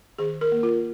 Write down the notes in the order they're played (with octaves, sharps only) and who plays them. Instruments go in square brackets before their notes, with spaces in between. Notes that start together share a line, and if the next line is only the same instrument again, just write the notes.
[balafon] D#3 G#4
A#4
A#3
F4